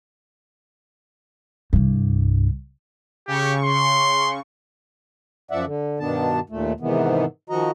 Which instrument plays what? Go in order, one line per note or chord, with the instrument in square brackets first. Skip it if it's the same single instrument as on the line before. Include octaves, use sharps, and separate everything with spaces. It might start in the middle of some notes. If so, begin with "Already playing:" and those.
[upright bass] C2 G2
[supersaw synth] C#3 C#6 [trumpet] G4
[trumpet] C6
[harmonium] F#2 F3 D5 E5 F#5
D3
G2 B2 D#3 B3 D4 A5
D#2 A#2 A3
G#2 C3 D#3 E3 B3
D#3 F3 F#4 D#5 A#5